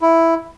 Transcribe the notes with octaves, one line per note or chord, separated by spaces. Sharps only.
E4